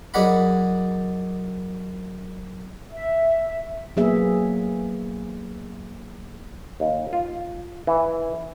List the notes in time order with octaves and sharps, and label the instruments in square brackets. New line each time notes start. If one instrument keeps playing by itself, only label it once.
[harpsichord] F#2 D#4 G#4 D5 F#5 B5
[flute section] E5
[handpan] F#3 A#3 B3 G#4 E5
[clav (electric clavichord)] D#2
F4
E3